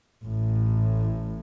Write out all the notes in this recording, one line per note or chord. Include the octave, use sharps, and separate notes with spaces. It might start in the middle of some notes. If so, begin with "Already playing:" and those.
A1 A2